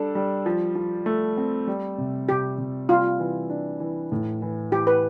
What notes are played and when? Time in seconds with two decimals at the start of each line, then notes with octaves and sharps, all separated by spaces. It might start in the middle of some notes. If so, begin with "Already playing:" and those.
Already playing: G3 D4 A4
0.15 G3
0.46 F3
0.75 F3
1.06 A3
1.38 C4
1.67 G3
1.98 C3
2.29 C3 G4
2.58 C3
2.89 G3 F4
3.20 E3
3.50 D4
3.80 E3
4.12 A2
4.42 E3
4.71 E3 G4
4.87 B4